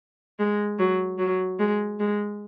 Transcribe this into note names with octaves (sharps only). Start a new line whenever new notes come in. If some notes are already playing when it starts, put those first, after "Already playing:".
G#3
F#3
F#3
G#3
G#3